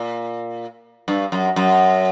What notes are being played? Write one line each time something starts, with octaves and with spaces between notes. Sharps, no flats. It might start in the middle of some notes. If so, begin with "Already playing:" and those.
Already playing: A#2
G2
F#2
F#2